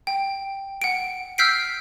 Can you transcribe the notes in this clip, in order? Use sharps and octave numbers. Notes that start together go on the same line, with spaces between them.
G5
F#5 D7
E6 F6 G6 B6 C7 D7